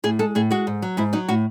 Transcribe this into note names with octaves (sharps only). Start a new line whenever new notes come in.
A2 G#4
G#3 A4
A2 G#4
G#3 F#4
G#2
F#3
G#2 E4
F#3 D#4
A2 F#4